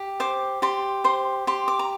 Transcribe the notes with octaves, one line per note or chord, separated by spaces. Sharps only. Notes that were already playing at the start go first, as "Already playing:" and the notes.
Already playing: G4
C5 D6
G4 C6
C5 C6
G4 C6
D6
A#5